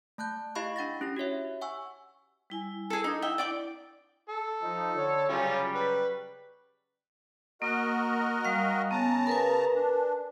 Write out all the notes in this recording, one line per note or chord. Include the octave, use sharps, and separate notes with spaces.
A3 A5 F#6 G6
E4 G4 D#5 F5 B5 C#6
D4 F#5 A6 A#6
C#4 E4 G4 A#6
F#4 G4 C#5 E5
F#5 G#5 C#6 E6
G3 E4 G#5
G#4 A4
D4 D#4 D#6
E4 E5 G5
D5 G5 D6
A4
F3 D#4
D3 C#5
C#3 F#3 G3 C#4 F4
B4
A#3 F#4 A#4 D#5
G3 F5
C#3 B3 A5 A#5
A#4 B4 G#5
D4